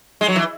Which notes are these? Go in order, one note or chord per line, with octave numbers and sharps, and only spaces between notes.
G#3
F#3
E3